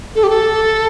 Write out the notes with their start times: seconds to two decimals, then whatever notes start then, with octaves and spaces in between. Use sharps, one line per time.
0.15 A4
0.23 G4
0.30 A4